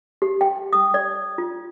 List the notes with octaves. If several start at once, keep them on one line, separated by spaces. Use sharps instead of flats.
G4
G5
D#6
D5
F4